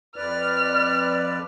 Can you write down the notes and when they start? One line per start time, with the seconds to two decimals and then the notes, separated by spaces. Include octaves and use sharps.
0.16 F2 B4 D5 F6